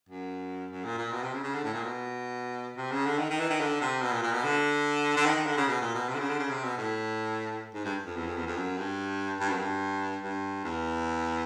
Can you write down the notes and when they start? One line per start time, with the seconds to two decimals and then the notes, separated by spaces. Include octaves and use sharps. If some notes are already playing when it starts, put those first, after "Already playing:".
0.09 F#2
0.71 F#2
0.85 A#2
0.98 A#2
1.12 B2
1.23 C3
1.33 C#3
1.43 C#3
1.54 D3
1.64 A2
1.74 A#2
1.84 B2
2.77 C3
2.91 C#3
3.06 D3
3.19 D#3
3.30 D#3
3.40 E3
3.50 D#3
3.60 D3
3.81 C3
4.02 B2
4.12 A#2
4.23 A#2
4.33 B2
4.43 D3
5.17 D3
5.26 D#3
5.36 D#3
5.46 D3
5.57 C#3
5.68 B2
5.81 A#2
5.94 B2
6.09 C3
6.14 D3
6.19 C#3
6.29 D3
6.39 C#3
6.50 C3
6.64 B2
6.78 A2
7.74 G#2
7.85 G2
8.06 F2
8.16 E2
8.26 F2
8.36 E2
8.47 F2
8.57 F#2
8.78 G2
9.40 G2
9.49 F#2
9.58 G2
10.23 G2
10.64 E2